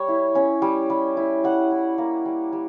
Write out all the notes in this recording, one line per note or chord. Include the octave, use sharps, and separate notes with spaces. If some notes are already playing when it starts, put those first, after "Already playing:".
Already playing: G3 C#5
E4
C#4
G3
G3
E4
G3 F#5
E4
A#3
G3
G3